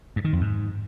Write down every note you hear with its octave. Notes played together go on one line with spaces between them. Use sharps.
G2
D#3
F2
G#2